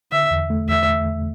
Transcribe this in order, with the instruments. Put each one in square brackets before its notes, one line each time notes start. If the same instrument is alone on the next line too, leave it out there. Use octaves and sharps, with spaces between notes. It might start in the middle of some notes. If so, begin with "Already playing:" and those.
[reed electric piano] D3 [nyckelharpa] E5
[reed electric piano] E2
A3
[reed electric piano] E2 [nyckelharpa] E5
[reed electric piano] E2
E2